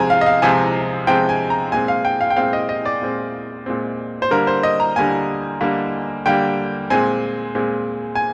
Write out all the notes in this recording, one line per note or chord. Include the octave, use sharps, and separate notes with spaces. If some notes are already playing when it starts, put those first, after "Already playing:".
Already playing: C3 F3 G#3 C4 G#5 A#5
F5
D#5
F5
C3 F3 G#3 C4 G#5
C3 F3 G#3 C4 G5
G#5
A#5
A#2 G#3 C4 G#5
F5
G5
F5
G5
A#2 G#3 C4 F5
D#5
D#5
D5
A#2 G#3 C4
A#2 G#3 C4
C5
D3 G3 A#3 A#4
C5
D#5
A#5
D3 G3 A#3 G#5
D3 G3 A#3
D3 G3 A#3 G5
A#2 G#3 C4 G#5
A#2 G#3 C4
G#5